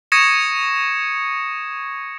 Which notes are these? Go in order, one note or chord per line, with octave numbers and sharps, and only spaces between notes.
C#6 D#6 G#6 A#6 C#7 E7